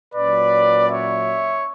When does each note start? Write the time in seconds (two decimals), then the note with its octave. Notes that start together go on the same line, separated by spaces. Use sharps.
0.13 A#2 F#3 C#4 B4 D5
0.89 C#5 E5